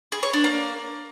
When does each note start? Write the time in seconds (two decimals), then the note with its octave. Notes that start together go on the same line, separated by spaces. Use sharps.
0.12 G#4
0.23 C#5
0.33 D4
0.44 A#3